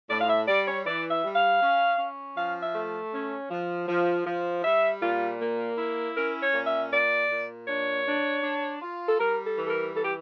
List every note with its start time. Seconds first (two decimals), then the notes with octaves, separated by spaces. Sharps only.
0.10 A2 D5
0.21 F5
0.29 E5
0.48 G3 D5
0.67 C#5
0.86 E3 D5
1.11 E5
1.24 G3
1.36 F5
1.62 C#4
1.99 C#4
2.37 F3 F5
2.63 E5
2.75 A3
3.13 C#4
3.51 F3
3.88 F3
4.27 F3
4.64 G3 E5
5.02 A#2 F4
5.41 A#3
5.78 E4
6.16 C#4 A#4
6.42 C#5
6.54 A#2
6.67 E5
6.92 A#2 D5
7.30 A#2
7.68 D4 C#5
8.06 D4
8.44 D4
8.82 F4
9.09 A4
9.19 G3 A#4
9.46 A4
9.58 E3
9.67 A4
9.70 A#4
9.95 E3 A4
10.05 G4